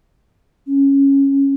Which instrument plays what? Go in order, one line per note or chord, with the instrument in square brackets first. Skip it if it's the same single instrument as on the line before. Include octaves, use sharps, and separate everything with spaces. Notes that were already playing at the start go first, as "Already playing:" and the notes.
[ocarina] C#4